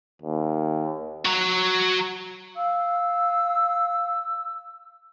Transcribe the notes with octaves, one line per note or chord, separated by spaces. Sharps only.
D#2
F#4 A#5
F5 E6